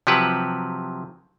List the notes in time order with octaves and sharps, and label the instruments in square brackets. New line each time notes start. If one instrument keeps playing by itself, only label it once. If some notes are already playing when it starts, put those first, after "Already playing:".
[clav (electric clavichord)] C3 F3 F#3 G4 B4 F#5